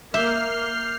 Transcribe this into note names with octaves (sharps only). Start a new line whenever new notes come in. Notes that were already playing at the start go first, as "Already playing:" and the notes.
A#3 E5 D6 F6 G6 C7 G7